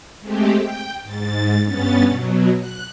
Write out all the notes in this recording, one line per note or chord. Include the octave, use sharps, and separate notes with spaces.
G#3 A3 C4 G4
G5
G#2 A6
G2 B3 C#4 A6
B2 F#3
F#6